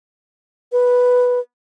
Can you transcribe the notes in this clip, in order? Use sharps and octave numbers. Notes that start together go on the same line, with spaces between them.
B4